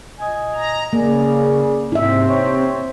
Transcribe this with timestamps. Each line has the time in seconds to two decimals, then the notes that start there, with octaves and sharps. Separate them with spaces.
0.19 A#2 D#5 G#5
0.55 A#5
0.93 C#3 A#3 G#4 D5
1.92 G#2 C3 C4 E4 E5
2.28 C5 C#5